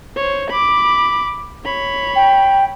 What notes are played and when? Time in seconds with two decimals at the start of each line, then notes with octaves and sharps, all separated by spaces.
0.16 C5 C#5
0.50 B5 D6
1.65 C#5 B5
2.15 G5